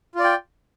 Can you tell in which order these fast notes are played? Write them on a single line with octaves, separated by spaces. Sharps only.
F4 D5 G5